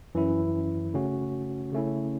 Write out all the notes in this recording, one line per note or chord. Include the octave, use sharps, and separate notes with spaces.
F#2 E3 C#4 E4
C#3 A3 C#4 F#4
C#3 A3 C#4 E4